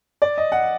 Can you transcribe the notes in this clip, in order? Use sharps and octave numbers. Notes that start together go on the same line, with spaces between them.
D5
D#5
F#5